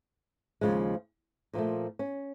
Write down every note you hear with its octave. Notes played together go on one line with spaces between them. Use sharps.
D#2 C#3 F3 G#3
A#2 F3 A3
C#4